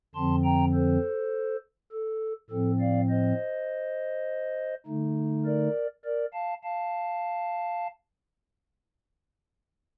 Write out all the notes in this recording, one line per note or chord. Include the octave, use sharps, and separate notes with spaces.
F2 D3 F3 C4 A5 C6
G5 A#5
A4 C5
A4
A2 F3 C4 A4
D5 F5
C5 D#5
D3 A3 D#4
A#4 D5
A#4 D5
F5 A5
F5 A5